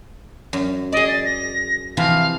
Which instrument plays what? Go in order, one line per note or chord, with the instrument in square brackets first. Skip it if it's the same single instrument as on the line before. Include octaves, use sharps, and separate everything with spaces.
[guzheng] F#2
[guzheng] G#4 D5 [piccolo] D#5
[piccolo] A6
A#6
[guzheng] C3 E3 F3 [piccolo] F5